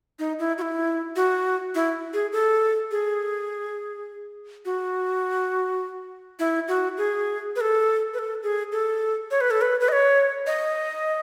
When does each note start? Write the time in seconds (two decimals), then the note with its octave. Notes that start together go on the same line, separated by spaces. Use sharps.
0.19 D#4
0.39 E4
0.58 F#4
0.62 E4
1.16 F#4
1.75 E4
2.13 G#4
2.33 A4
2.91 G#4
4.65 F#4
6.39 E4
6.68 F#4
6.97 G#4
7.56 B4
7.61 A4
8.14 B4
8.19 A4
8.43 G#4
8.72 A4
9.31 C#5
9.41 B4
9.51 A4
9.61 B4
9.80 B4
9.89 D#5
9.92 C#5
10.47 D#5